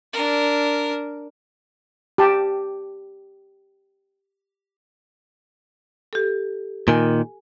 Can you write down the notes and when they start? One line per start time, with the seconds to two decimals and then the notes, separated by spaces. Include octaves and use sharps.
0.13 D4 A#4
2.18 G4 A5
6.13 G4 A4
6.88 A#2 D#3 G#5